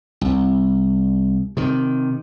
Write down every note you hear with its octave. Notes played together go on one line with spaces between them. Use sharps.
C2
C3 D#3